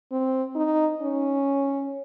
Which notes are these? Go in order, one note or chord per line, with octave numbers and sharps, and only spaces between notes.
C4
D#4
C#4